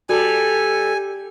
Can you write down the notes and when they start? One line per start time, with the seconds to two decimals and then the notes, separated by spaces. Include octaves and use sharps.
0.09 G3 F#4 A4 G#5